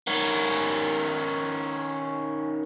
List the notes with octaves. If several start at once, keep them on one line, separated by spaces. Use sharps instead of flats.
D#3 C#4